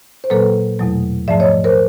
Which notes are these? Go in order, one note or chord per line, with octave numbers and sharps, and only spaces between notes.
C5
A#2 F#3 A#3 A4 B4
E2 B2 F#3 A3
G#2 F3 A3 D5 E5
C#5 D#5
A#4 C5